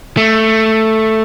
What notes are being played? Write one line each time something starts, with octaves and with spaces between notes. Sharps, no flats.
A3